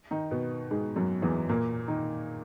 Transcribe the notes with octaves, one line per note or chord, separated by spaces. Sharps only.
D#3 D#4
B2 B3
G#2 G#3
F#2 F#3
E2 E3
A#2 A#3
D#3 D#4